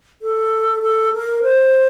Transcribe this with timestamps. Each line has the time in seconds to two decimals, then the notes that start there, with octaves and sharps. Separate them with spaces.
0.22 A4
0.82 A4
1.13 A#4
1.43 C5